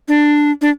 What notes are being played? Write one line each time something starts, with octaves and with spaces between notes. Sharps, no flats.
D4
D4